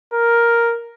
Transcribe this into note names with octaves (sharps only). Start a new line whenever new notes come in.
A#4